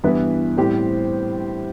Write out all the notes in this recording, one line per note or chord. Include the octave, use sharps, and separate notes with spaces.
G2 E3 B3 E4 B4
A2 G3 C4 G4 C5